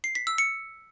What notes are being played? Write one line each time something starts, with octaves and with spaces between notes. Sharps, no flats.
C7
B6
E6
C#7